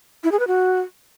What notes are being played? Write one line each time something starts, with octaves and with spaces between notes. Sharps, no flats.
E4
G#4
B4
F#4